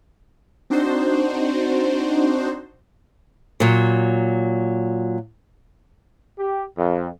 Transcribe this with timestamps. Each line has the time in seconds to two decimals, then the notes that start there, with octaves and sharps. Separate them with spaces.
0.70 C4 D4 D#4 F#4 C5
3.60 A#2 F#3
6.38 G4
6.77 F2